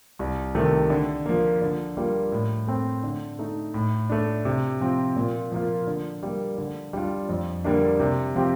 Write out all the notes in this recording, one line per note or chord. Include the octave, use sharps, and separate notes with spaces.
C2
C3 D#3 A3
D3
F3 A#3
D3
G3 A#3 F4
A2
A3 C4
D3
A3 D#4
A2
A3 D4
C3
F3 C4
A#2
F3 A#3 F4
D3
G3 A#3
D3
G3 D4 F4
F2
D3 G3 A#3 D4
C3
F3 C4 G4